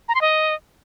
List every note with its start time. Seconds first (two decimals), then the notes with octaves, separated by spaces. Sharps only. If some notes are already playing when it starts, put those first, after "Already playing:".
0.09 A#5
0.15 C6
0.21 D#5